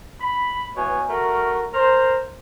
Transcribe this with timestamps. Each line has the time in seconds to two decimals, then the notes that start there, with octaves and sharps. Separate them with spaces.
0.21 B5
0.77 B2 E3 C#5 G#5
1.09 A3 F#4 A#4
1.74 A#4 C5